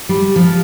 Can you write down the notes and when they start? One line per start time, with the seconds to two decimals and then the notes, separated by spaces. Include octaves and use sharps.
0.09 G3
0.36 F3